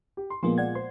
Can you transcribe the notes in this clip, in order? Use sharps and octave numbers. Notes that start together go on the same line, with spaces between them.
G4
C6
A#2 F3 G#3 A#3 B3 C6
D5 F#5 G#6
C5 C6